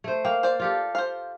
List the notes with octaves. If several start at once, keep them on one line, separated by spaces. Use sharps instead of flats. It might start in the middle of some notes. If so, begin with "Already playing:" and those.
A3 C5
A#3 G5
C5 D5
F4 G4 A4
C5 F5